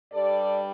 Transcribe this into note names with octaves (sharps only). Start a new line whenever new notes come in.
G2 G3 A4 D5